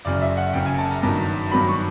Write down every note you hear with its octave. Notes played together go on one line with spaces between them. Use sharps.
F#1 F#2 C#3 D5
E5
F#5
F#1 F#2 C#3 G5
G#5
A5
A#5
G2 D#3 F#3
G2 D#3 F#3 B5
C#6